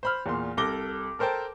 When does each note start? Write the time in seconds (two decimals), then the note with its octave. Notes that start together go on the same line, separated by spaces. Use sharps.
0.03 C5 B5 F6
0.26 E2 A#2 C6
0.57 C2 A4 D6 A#6 G7
1.19 A4 A#4 C5 G5 A5